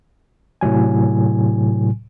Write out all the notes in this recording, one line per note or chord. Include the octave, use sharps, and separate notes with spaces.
A2 C3 F#3 G#5